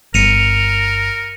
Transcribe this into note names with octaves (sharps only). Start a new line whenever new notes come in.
G1 A#4 C#7 D#7 F7